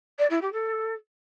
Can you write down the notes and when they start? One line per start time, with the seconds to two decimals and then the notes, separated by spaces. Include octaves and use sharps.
0.18 D5
0.30 E4
0.41 G4
0.52 A4